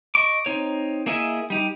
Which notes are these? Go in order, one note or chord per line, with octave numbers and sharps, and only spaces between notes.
D#5 C#6 D6
C4 D#4 C#5
A#3 E4 G#4 D#5 E5
G3 D#4 G4